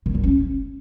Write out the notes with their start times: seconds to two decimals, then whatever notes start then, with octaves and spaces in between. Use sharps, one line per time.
0.06 D#3
0.15 F#3
0.23 C#4